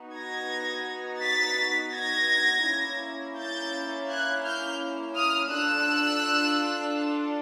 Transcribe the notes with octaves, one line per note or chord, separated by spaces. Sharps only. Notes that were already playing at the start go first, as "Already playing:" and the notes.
Already playing: B3 D#4 F#4
G#6 A#6
A6 B6
G#6 A#6
A#3 C#4 E4
G6 A6
F#6 G#6
F6 G6
D#6 F6
D4 F4 A4 E6 F#6